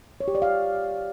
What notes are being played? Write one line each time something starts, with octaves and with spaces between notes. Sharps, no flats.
C#5
G4
D5
F5